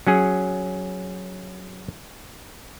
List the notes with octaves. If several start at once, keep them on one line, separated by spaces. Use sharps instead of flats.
F#3 C#4 G#4